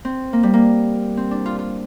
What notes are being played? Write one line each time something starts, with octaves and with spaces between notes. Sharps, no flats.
C4
A#3
G3
A#3
C4
D4
F4
F4